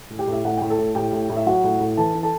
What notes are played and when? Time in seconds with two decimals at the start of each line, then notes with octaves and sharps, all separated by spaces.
0.10 A2
0.19 G4 G5
0.28 A2 E5
0.45 A2 F#5
0.58 A2 G5
0.70 A4 A5
0.78 A2
0.95 A2 G4 G5
1.13 A2
1.30 A2
1.37 E5
1.46 F#3 F#4 F#5
1.64 A2
1.80 A2
1.97 E3 A4 A5
2.14 E3
2.23 A4 A5